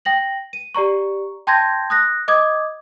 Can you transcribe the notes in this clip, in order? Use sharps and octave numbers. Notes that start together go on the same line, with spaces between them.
G5 A#6 F#7
D#7
G4 D5 A#5 C#6
G5 A5 C6 G6 G#6 A#6
D#6 F#6 A#6
D#5 D6 D#6 G#6